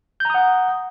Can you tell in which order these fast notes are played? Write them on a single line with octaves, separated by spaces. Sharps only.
G6 A#5 D#6 F#5